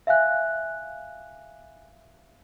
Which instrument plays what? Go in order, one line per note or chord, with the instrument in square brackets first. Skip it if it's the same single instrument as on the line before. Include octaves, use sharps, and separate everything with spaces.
[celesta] E5 F5 G#5 F#6